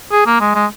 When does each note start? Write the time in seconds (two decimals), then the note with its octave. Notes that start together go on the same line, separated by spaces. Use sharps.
0.12 G#4
0.26 A#3
0.40 G#3
0.55 G#3